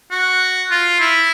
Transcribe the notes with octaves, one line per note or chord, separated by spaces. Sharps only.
F#4
F4
E4